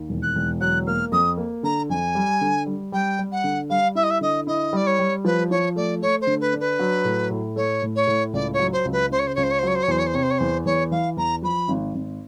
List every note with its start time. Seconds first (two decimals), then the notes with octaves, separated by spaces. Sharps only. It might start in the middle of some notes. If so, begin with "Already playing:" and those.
Already playing: D#2
0.09 E1
0.22 F#6
0.35 E1
0.60 F#3 F#6
0.87 A#3 F6
1.12 F2 D#6
1.38 A#3
1.63 D3 A#5
1.90 F2 G#5
2.15 G3
2.41 D3
2.66 G3
2.92 G3 G5
3.19 G3
3.32 F#5
3.44 D3
3.70 G3 F5
3.95 E4 E5
4.03 D#5
4.10 E5
4.21 D3 D#5
4.47 E4 D#5
4.73 G3 D5
4.86 C#5
4.99 G3
5.25 F3 B4
5.50 F3 C#5
5.76 A3 D5
6.02 A3 C#5
6.21 C5
6.27 D3
6.40 B4
6.53 D4
6.60 B4
6.79 F#3
7.05 A2
7.30 A2
7.56 A3 C#5
7.82 A2
7.95 C#5
8.07 A2
8.33 C#2 D5
8.53 C#5
8.59 F#3
8.72 C5
8.85 C#2
8.92 B4
9.11 C#3 C5
9.19 C#5
9.27 C5
9.35 C#2 C#5
9.43 C5
9.50 C#5
9.58 C5
9.63 F#3 C#5
9.75 C5
9.83 C#5
9.88 E2 C5
9.98 C#5
10.06 C5
10.14 C3 C#5
10.22 C5
10.30 C#5
10.38 E2 C5
10.65 E2 C#5
10.91 E3 F5
11.17 E2 A#5
11.42 F3 B5
11.68 G#1
11.95 G#1